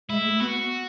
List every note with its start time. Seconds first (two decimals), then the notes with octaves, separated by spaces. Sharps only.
0.09 G#3 E4
0.25 A3
0.40 B3 F#4